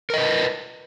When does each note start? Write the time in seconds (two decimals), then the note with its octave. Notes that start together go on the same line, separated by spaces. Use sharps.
0.10 A#4
0.14 D#5
0.17 B4